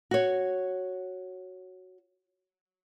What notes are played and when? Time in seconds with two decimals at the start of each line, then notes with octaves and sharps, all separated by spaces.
0.11 F#4 C#5